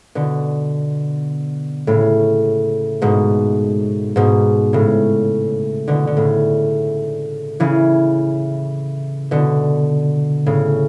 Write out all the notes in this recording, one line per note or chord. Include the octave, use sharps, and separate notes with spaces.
B2 D3
A2 C#3
G#2 B2
G#2 B2
A2 C#3
B2 D3
D3
A2 C#3
C#3 E3
B2 D3
A2 C#3